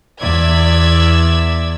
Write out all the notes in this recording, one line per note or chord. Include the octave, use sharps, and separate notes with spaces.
E2 D5 E5 E6 G#6